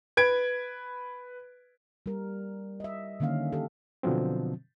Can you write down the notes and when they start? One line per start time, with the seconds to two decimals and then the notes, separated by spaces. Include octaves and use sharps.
0.17 B4 G#6 D7
2.06 G3 A#4
2.80 D#5 E5
3.20 D3 D#3 A#3 C#4 F5
3.53 G4 A4
4.03 B2 D3 F3 F#3 C4